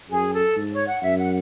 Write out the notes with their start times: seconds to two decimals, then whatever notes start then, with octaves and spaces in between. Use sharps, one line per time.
0.09 F#2 G#4
0.33 A4
0.56 G#2
0.72 C#5
0.87 F#5
1.03 F#2 E5
1.18 F#5